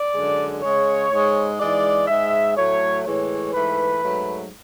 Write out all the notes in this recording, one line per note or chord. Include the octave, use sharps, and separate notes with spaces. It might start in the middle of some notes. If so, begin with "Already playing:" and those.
Already playing: D5
F#2 D3 G#3
C#3 G#3 C#5
G#2 G#3
G#2 E3 G#3 D5
G#2 G#3 E5
A2 F#3 A3 C#5
A2 E3 G#3 C#5
G#2 E3 A3 B4
G#2 F#3 A3